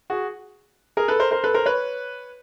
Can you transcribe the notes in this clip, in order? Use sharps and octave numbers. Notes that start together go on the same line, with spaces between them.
F#4 G#4
G#4 A#4
A4 B4
A#4 C5
A#4 C5
A4 B4
A#4 C5
B4 C#5